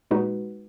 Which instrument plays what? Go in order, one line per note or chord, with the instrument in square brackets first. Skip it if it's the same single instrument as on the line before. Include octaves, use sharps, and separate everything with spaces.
[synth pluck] A#2 G#3 D#4 F#4 B4